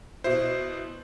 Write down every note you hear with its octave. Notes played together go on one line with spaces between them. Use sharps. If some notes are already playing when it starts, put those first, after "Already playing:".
B2 E4 C5